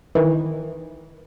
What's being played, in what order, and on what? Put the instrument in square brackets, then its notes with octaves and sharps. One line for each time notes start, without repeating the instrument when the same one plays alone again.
[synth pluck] D#3 E3